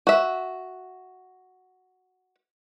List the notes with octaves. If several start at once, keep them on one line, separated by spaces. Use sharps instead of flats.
F#4 E5